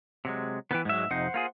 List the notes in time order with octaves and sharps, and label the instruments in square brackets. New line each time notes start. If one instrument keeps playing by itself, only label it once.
[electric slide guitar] C3 F#3 G#3
[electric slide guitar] D#3 E3 [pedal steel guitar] B3 B4 G5
[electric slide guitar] G#2 E5 [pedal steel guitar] F#3 G#3
[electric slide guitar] F2 C3 D#4 [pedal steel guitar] C5 F#5
[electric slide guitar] A#3 F4 G#4